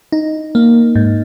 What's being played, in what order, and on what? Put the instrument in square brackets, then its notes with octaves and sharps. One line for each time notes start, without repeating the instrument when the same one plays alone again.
[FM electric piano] D#4
A#3
G#2